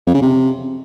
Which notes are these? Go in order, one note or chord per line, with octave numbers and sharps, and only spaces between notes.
F2
C#3
C3